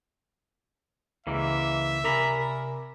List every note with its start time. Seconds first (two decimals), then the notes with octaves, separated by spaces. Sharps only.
1.27 C#2 C#3 E3 G#3 A#3 E5
2.04 C3 A#4 D5 G#5 A#5 B5